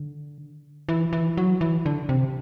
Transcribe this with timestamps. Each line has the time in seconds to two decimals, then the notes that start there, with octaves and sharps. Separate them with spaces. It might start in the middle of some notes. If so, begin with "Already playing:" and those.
Already playing: D3
0.89 E3
1.13 E3
1.37 F#3
1.61 E3
1.86 D3
2.09 C3